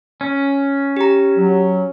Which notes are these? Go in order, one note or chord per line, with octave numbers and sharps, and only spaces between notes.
C#4
G4 A#5
F#3